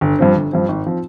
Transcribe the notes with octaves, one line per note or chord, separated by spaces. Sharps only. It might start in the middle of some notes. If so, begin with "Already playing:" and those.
G1
G2 F3 C4
G1
G2 F3 C4
G#1
F3 C4